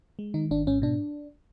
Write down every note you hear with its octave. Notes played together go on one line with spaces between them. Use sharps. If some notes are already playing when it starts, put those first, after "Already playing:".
G#3
D#3 D#4
G#1 D4
G#2 C#4
B2 D4